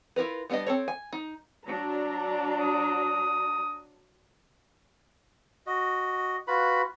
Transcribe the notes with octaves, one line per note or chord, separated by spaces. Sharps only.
E4 F4 A#4 B4
G3 B3 D4 G4 D#5
C4 A4 C#5
G#5
D#4
F#3 D4 A#5
D#6
F#4 D#5
F4 F#4 B4 B5